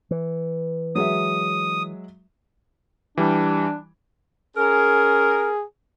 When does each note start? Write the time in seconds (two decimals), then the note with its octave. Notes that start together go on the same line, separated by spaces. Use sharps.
0.11 E3
0.95 F#3 G#3 E5 D#6
3.17 E3 G3 D4
4.57 C#4 G#4 A#4